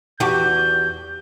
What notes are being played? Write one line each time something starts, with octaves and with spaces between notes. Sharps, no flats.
E2 F#4 G4 G6